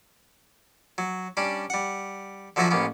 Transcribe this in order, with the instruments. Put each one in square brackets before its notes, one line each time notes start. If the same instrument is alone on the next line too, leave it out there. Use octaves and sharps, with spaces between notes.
[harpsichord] F#3
G3 C#4 D4
G3 F#5
D3 F3 F#3 F#4 E5 G#5
A1 A#3 B3 C#4